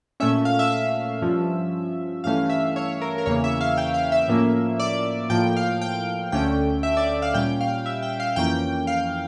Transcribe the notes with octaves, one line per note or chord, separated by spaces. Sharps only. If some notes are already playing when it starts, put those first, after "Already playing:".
A#2 A3 C#4 E5
F5
E5
E5
G2 F3 C#4
G2 E3 A3 C#4 F5
E5
C#5
A#4
A#4
E2 C#3 E3 A#3 C#4 C#5
E5
F5
G5
F5
E5
A2 F3 A#3 C#4
D5
A2 F3 A#3 G5
F5
G5
D2 D3 A3 C#4 G5
E5
D5
F5
A#2 G3 C#4 G5
F5
E5
G5
F5
F2 E3 A#3 C#4 G5
F5